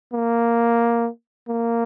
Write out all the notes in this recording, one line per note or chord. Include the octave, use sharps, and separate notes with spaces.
A#3
A#3